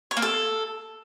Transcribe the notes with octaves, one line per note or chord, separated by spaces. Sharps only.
C#5
A#3
A4